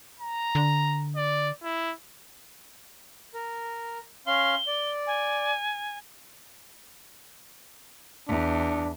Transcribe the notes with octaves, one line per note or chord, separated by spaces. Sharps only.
A#5
D3
D5
E4
A#4
C#4 F5 C6 G7
D5
G#5
E2 D4